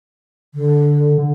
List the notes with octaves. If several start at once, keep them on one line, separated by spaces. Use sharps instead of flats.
D3
D3